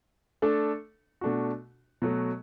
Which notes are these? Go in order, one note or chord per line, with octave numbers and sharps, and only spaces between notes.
A3 D4 A4
B2 A3 D4 F#4
B2 F#3 A3